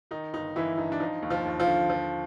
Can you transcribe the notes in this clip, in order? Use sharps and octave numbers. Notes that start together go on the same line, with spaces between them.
D#3 D#4
G1 D#4
G1 E3 E4
G2 D#4
D4
F3 D#4
D#2
F3 F4
D#2
F3 F4
D3
F3